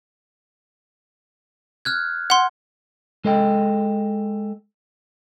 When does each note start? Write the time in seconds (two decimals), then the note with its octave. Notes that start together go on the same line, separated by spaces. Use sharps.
1.85 F6 F#6 G#6
2.30 F#5 C6
3.25 G#3 A4 D#5 G5